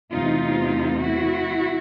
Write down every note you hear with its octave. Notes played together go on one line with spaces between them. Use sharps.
E2 C3 E3 A3 D#4 F4
E4 F#4